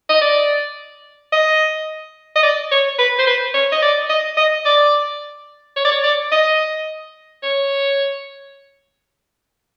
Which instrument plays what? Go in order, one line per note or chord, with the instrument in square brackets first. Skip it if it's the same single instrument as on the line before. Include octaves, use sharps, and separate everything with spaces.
[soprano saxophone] D#5
D5
D#5
D#5
D5
C#5
B4
C5
B4
C#5
D#5
D5
D#5
D#5
D5
C#5
D5
C#5
D5
D#5
C#5